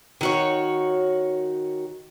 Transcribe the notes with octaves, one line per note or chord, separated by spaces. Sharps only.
D#3 F#4 C#5